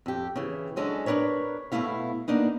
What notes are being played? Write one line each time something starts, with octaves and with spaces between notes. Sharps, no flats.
F2 G4
C#3 E3
F#3 G#3 C#4 D4 A4
D4 F4 A#4 B4 C#5
B2 E3 A3 B3 E4 F5
A#3 B3 D4 D#4